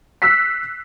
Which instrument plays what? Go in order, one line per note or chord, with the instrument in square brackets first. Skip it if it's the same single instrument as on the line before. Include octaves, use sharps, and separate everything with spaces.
[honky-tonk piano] E6 F#6 B6 C7